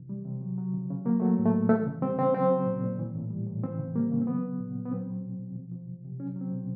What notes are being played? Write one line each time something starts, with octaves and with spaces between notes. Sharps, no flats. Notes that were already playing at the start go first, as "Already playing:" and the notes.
Already playing: C3 E3
G3
C3
F#3
F#3
C#3
C#3
F#3 A#3
F#3 A3
A2
A3
A2
E3 A3
C#3
G3 C4
C#3 C4
F#3 C4
F#3
A#2
A#2
E3
A2
G3
A2
E3 C4
C#3
G3 A#3
C#3
C4
F#3 B3
F#3
A#2
A#2
B3
F#3 C4
F#3
B2
B2
F3
F3
C3
C3
F#3 C#4
F#3
C4
B2